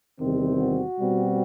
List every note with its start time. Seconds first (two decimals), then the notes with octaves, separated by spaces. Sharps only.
0.20 E2 C3 D#3 G3 C4
0.59 F#4
0.98 B2 G3 C4